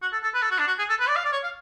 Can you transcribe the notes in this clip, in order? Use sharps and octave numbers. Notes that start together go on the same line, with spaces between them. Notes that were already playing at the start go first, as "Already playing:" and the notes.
F#4
A4
A4
B4
A4
F#4
D4
F#4
G#4
A4
B4
D5
F5
D5
C#5
F5